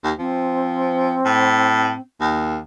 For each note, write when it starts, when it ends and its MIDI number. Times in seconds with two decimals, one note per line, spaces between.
0.04 0.13 39
0.19 1.19 53
0.19 2.00 60
1.25 1.93 45
2.21 2.58 39